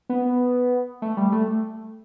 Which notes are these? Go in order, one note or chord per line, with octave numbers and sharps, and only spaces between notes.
B3
A3
G3
A3